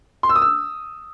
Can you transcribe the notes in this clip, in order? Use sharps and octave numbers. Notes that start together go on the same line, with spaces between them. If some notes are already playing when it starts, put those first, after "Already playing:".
C6
E6
D#6
E6